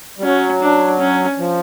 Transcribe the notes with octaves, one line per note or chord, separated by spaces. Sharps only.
G3
F#3 C#4
D4
C#4
F3